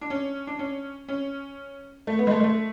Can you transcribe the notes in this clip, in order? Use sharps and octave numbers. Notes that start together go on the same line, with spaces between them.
D4
C#4
D4
C#4
C#4
A3
B3
G#3
A3
G#3
A3